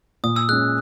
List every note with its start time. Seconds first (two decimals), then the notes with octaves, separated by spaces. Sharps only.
0.24 A#2 D#6
0.36 E6
0.49 G#3 C#4 F#6